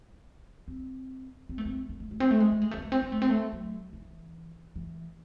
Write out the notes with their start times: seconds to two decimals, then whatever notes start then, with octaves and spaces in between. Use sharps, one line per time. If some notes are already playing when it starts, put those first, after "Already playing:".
0.68 C4
1.49 C4
1.58 A3
1.65 C4
1.89 A3
2.00 A3
2.11 A3
2.20 C4
2.31 A3
2.40 G#3
2.51 A3
2.62 G#3
2.71 A3
2.77 C4
2.82 A3
2.92 C4
3.02 C4
3.12 A3
3.22 C4
3.30 A3
3.53 F#3
3.93 E3
4.76 E3